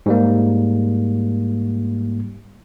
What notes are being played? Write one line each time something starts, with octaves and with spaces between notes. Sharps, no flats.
G#2 G3 A#3